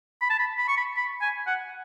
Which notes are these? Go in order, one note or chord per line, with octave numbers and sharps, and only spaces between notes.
B5
A5
B5
B5
C#6
B5
B5
G#5
F#5